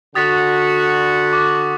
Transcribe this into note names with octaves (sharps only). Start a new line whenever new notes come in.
D3 F#4 D#6 A6 B6
D6